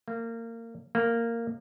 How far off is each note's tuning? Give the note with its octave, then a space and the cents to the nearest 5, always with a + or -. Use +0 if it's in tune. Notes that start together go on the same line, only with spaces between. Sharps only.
A#3 -25
A#3 -10